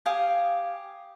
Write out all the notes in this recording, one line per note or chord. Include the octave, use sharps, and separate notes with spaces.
G4 F5 G#5 D#6